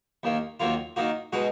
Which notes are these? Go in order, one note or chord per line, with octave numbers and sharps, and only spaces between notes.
D#2 D#3 A#3
D#2 D#3 F#3 A#3 F4
D#3 A#3 D#4 F#4
B2 G#3 D#4 F#4